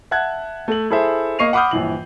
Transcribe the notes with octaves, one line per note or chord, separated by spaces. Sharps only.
E5 F#5 A5 F#6 G#6
A3 F#7
E4 G#4 A4 C5 E5
A#3 D#5 C#6 C7 D#7 F7
F#5 B5 D6 D#6 F6 G6
A#1 G2 E3 F#7